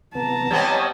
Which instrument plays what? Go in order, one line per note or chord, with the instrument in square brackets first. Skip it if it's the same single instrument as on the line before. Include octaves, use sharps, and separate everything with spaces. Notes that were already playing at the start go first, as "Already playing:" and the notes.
[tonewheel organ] C3 B3 [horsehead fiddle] A5 A#5
[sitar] G3 B3 C4 [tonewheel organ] C#5 D#5 G#5